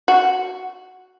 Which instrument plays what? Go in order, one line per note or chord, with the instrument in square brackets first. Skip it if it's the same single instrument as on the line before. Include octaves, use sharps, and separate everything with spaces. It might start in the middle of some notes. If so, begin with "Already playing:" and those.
[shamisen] F#4